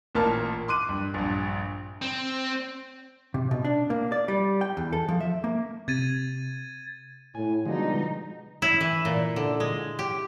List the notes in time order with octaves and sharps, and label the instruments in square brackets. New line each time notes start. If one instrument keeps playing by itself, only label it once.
[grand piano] A1 A#2 A#3 A5 F6
C6 D6 F#6 D#7
G2
A#1 G2
[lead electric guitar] C4
[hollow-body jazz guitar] C3
B2
D4
A#3
D5
G3
G5
E2
A4
F3
E5
A#3
[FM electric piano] C3 [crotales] G#6 A6 D#7
[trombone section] A2 [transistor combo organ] G#5
[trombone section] B2 [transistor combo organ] D3 F3 G#3 [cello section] G3 D#4
[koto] E4
E3
A#2
D3
G#3
G4